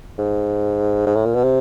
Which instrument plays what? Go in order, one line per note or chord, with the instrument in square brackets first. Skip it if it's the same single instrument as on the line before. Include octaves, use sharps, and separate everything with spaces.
[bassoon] G#2
G#2
A2
A#2
B2
C3